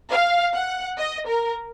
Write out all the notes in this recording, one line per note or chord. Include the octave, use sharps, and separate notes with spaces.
F5
F#5
D#5
A#4